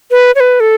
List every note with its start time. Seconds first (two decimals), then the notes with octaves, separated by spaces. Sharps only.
0.11 B4
0.35 C#5
0.40 B4
0.60 A4